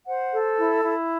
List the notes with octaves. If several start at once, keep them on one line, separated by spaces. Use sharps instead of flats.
C5 F#5
A4
E4
E4